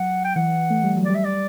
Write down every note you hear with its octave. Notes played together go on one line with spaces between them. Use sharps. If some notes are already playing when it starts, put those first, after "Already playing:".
Already playing: F#3 F#5
G5
E3 F#5
A3
G3
F#3
D5
G3
E5
D5